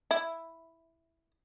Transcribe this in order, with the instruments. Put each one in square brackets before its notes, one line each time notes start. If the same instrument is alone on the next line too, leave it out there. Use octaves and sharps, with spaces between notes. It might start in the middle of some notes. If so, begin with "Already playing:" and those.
[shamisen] E4